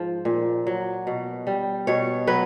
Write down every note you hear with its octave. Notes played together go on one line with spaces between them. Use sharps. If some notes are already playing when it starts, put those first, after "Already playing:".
Already playing: G#2 F3
A#2
F#3
B2
G3
B2 C#5
F#3 B4